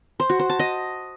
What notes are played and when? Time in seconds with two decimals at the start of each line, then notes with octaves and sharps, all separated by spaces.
0.20 C5
0.30 F#4
0.40 C5
0.50 A5
0.59 D#5